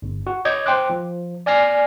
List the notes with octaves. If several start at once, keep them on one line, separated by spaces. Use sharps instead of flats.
G1
F#4
C#5 D#5 D6 G6 G#6
C5 G5 C6 D6 F#6
F3
D5 G#5 F6 A#6 C7